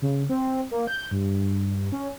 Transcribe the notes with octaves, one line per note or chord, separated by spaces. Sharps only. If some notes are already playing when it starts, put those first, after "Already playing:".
C#3
C4
A#3
G6
G2
C#4